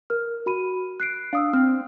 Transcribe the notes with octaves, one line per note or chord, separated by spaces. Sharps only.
A#4 F6
F#4 B5 D#7
F#6 C7 D7
D4 F5 D#6 E6
C4 F6